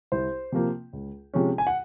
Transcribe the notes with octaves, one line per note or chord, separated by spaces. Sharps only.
C2 C5
C3 F3 A#3
C#2
C3 F3 G#3 C#4
G#5
F#5